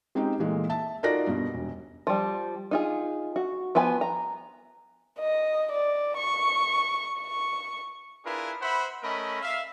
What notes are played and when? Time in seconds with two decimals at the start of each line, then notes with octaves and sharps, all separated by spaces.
0.15 G#3 C4 C#4 D#4 G4
0.39 A#2 E3 G#3 A3
0.69 E5 A5
1.03 D#4 F4 F#4 A#4 D5 A#6
1.27 G2 B2
1.54 E1
2.07 F3 G3
2.71 D#4 F4 G#4
3.36 F#4
3.75 F3 B3 B4 G#5
4.01 A#5
5.19 D#5
5.72 D5
6.17 C#6
7.19 C#6
8.25 D4 E4 F4 G#4 A#4 B4
8.61 C5 E5 F#5 B5
9.03 A3 C#4 A#4 D#5 B5
9.42 E5 F5